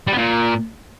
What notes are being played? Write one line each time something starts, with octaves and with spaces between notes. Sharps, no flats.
G3
B3
A#2